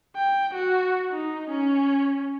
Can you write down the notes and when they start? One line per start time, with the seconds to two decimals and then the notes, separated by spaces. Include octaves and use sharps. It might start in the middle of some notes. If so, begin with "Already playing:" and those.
0.16 G5
0.54 F#4
1.11 D#4
1.50 C#4